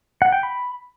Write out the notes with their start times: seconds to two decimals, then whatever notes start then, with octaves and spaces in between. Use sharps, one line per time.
0.22 F#5
0.32 G5
0.43 B5